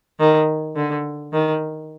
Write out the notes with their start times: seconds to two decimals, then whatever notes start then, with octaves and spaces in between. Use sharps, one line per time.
0.19 D#3
0.76 D3
1.33 D#3